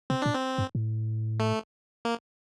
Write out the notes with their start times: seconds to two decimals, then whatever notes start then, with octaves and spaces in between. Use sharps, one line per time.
0.10 C3 C4
0.22 A#2 D4
0.34 C4
0.58 G2
0.75 A2
1.40 A3
2.05 A#3